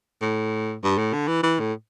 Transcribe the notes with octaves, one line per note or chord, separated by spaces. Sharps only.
A2
G2
A2
D3
E3
E3
A2